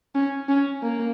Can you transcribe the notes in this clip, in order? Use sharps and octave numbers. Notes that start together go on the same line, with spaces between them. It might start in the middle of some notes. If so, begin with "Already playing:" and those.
C#4
C#4
A#3